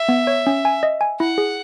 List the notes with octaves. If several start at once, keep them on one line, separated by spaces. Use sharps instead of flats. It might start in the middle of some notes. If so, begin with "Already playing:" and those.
Already playing: E5
B3
C#5
C#4
G#5
D#5
G#5
E4 F#5
G#4